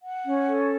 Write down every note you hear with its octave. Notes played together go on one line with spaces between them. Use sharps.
F#5
C#4
A4